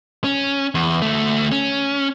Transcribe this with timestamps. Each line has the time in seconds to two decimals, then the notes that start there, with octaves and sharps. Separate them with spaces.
0.24 C#4
0.75 E2
1.02 D2 A3
1.52 C#4